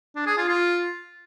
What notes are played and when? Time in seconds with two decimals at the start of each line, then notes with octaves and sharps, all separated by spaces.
0.15 D4
0.26 G#4
0.37 F4
0.48 F4